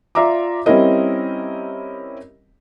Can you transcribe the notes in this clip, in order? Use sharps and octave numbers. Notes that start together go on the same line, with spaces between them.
F4 D5 E5 A#5 D6
G3 C4 C#4 E4 A#4 D#5